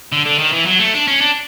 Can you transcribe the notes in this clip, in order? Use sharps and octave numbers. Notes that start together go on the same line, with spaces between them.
D3
D3
D#3
E3
F#3
A3
D4
C#4
D4